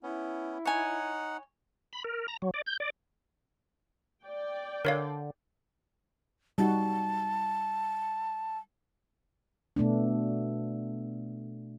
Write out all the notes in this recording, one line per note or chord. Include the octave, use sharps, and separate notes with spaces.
B3 C#4 E4
D#4 C#5 F#5 G#5
B5
A#4
A#5
F#3
D5
G6
D5
D5 G5
D3 A#4 C#5 F5
G3 D#4 F#4 A5
B2 A3 B3 D4